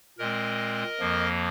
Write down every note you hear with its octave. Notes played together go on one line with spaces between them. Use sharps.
A#2 G#3 C4 A#4 D#5
F2 F3 A#3